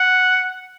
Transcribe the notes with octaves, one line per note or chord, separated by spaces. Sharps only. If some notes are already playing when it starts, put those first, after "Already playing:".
Already playing: F#5